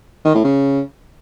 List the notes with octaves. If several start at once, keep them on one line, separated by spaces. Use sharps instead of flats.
D#3
A2
C#3